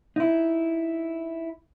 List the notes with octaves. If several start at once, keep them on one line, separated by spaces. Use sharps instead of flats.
D#4 E4